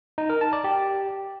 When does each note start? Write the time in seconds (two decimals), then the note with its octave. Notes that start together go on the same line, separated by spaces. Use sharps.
0.18 D#4
0.30 A#4
0.41 A5
0.53 D5
0.64 G4